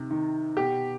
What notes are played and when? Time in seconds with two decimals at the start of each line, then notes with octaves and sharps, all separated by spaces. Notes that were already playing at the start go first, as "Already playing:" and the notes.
Already playing: C3 D#3
0.11 D#3
0.57 B2 G4